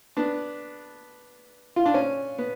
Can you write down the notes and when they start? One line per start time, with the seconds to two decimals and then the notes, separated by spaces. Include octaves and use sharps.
0.17 B3 D4
1.76 F4
1.86 D4
1.94 C#4
2.38 B3